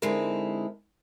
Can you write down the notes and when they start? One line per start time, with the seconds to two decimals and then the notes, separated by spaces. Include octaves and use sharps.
0.02 D3 G#3 C4 D#4 E4 A#4